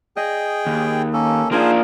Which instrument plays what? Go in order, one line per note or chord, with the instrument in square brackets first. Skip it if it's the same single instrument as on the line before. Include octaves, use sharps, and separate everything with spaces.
[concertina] G#4 G5 [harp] D#5
[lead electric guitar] D#2
[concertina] A#3 C#4 A4
[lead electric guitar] A#3 D4 [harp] D#4 F4 G#5 [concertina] G#4 C5